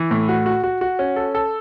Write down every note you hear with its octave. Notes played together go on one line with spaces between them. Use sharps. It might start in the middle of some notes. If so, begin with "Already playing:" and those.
Already playing: E3
A2
F#4
F#4
F#4
F#4
C#4
A4
A4